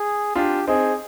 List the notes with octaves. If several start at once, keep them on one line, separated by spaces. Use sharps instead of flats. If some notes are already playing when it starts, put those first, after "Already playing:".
Already playing: G#4
D4 F4 G4
C4 D#4 G#4